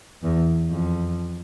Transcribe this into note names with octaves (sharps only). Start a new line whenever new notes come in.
E2
F2